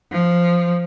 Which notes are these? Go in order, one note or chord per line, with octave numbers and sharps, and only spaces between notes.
F3